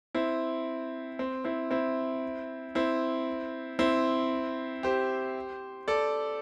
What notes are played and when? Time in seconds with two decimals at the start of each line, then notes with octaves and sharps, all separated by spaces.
0.15 C4 E4
1.19 C4
1.45 C4 E4
1.71 C4 E4
2.75 C4 E4
3.79 C4 E4
4.83 G4 C5
5.88 A4 D5